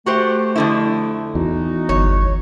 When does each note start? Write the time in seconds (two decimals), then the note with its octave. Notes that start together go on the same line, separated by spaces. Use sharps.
0.06 A3 F#4 G4 C5
0.56 F2 D3 E4
1.35 E2 D#4 F#4
1.89 G1 C#5